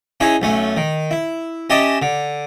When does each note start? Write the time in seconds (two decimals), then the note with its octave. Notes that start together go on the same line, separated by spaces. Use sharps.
0.20 C#4 D#4 E4 G#4 C#5
0.42 B1 A3 C#4
0.77 D#3
1.11 E4
1.70 C#4 G4 D#5 E5 A5
2.02 D3